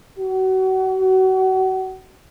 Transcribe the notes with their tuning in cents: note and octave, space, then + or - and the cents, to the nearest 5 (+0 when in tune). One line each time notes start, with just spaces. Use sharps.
F#4 +30